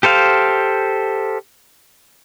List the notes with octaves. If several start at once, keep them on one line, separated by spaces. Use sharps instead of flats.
G4 A4 C5 F5